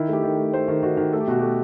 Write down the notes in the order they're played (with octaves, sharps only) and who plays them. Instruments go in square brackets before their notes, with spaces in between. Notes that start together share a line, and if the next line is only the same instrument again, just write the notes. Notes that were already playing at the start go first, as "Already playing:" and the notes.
Already playing: [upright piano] D#3 E4
A3 G4
D#3
A3
A3 C5
D#3
D#3 F#4
D#3
A3 A4
G4
B2 F#4
A3 G4